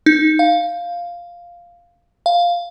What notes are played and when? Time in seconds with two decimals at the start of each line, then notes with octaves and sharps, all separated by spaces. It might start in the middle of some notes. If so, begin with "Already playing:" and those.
0.06 D#4
0.39 F5
2.26 F5